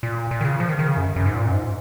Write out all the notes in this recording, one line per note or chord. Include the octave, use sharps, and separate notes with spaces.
A#2
A#2
D#3
C#3
F3
D#3
D#3
C#3
F#2
F#2
G#2
A#2
F#2
G#2